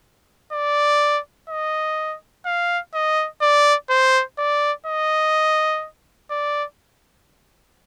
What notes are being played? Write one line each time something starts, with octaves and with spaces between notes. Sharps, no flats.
D5
D#5
F5
D#5
D5
C5
D5
D#5
D5